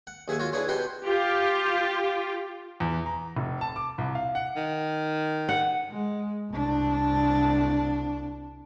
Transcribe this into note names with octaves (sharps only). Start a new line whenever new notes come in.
F#5
D#2 G#4 E5 F#5 G#5
F4 F#4 C#5
D4 E4 G#4 B4 C#5
B2 G4 B4 C5 F#5 C6
F4 G4
E2
A#5
F1
A5
D6
C2
F5
F#5
D#3
F#5
G#3
C2 D4